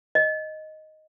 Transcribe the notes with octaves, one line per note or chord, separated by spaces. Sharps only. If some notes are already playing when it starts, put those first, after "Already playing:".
D#5